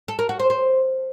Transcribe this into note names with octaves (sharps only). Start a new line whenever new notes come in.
A4
A#4
F#4
C5
C5